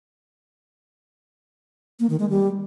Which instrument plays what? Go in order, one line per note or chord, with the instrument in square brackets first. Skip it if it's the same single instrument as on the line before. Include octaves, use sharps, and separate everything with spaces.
[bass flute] A#3
D#3
G#3
G3